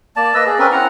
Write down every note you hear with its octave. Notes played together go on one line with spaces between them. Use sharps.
A#3 D5 A5
A#3 B4 D#5 E6
G#4 D5
C4 C#4 A#4 B4
C4 E4 F#5 A#5